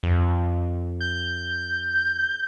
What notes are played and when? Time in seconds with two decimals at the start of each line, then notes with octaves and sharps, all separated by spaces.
0.03 F2
1.01 G6